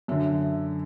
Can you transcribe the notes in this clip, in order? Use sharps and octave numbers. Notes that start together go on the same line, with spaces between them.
F#2 D3 E5